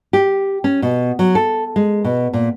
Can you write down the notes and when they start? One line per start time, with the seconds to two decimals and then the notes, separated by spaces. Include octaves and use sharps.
0.13 G4
0.64 C#4
0.82 B2
1.19 F#3
1.35 A4
1.76 G#3
2.04 B2
2.33 A#2